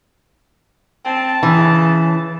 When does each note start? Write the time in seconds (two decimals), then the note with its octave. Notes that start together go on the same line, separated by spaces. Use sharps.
1.05 C4 A5
1.43 C#3 E3